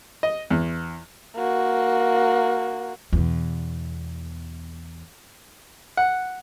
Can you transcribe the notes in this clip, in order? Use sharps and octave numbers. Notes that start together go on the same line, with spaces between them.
D#5
E2
A#3 F#4
E2 B2
F#5